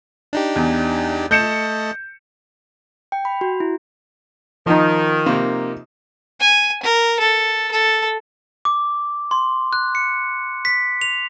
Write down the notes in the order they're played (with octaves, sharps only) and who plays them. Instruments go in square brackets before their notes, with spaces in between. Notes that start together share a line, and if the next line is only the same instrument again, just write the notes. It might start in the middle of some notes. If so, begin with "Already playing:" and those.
[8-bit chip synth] D4 D#4 G4
[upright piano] E2
[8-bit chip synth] A3 D#5 A5 [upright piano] G6 C#7 E7
[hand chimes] G5
B5
F#4
E4
[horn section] D#3 [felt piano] F3 D#4
[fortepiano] C3 A#3
[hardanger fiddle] G#5
A#4
A4
A4
[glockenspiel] D6
C6
F#6
C#7
B6
F7